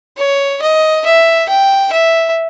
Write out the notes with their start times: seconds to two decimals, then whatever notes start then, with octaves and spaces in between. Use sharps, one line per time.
0.18 C#5
0.62 D#5
1.05 E5
1.49 G5
1.92 E5